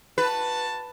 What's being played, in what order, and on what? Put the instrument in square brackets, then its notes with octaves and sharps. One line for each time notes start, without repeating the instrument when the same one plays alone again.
[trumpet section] F#4 A5 [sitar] B4